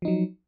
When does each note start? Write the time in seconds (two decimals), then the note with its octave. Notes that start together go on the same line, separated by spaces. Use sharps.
0.02 F3
0.05 D#4
0.08 F#3